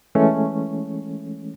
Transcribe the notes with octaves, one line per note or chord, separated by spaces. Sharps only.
E3 G#3 A3 C#4